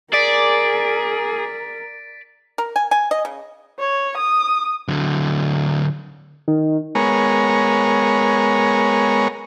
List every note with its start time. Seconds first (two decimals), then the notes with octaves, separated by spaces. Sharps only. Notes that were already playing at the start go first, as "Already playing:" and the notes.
0.13 G#4 A#4 D5 A6 B6 D7
2.58 A#4
2.76 G#5
2.91 G#5
3.11 D#5
3.25 C#3
3.79 C#5
4.17 D#6
4.88 D3 F#3
6.48 D#3
6.95 G#3 B3 A#4 C#5